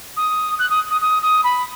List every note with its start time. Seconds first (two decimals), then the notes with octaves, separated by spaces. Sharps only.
0.16 D#6
0.59 F#6
0.70 D#6
0.90 D#6
1.01 D#6
1.22 D#6
1.44 B5